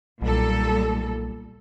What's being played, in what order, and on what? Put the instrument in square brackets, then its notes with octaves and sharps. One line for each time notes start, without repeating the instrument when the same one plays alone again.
[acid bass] B1 [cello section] A#2 G3 A4